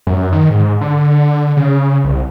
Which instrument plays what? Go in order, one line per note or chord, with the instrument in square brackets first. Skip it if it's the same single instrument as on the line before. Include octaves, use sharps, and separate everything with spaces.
[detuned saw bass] F#2
D#3
G#2
D3
C#3
C2